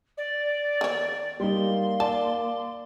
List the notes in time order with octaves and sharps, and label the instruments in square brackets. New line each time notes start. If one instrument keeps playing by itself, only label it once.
[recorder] D5
[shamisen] D#3 C#5
[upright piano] G3 D#4 [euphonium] A#3 [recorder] C6
[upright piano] D5 [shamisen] A5